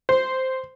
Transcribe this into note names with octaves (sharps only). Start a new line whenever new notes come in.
C5